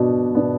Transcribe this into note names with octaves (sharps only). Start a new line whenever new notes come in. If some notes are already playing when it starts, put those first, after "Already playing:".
Already playing: B2 B3 D4
B3 D4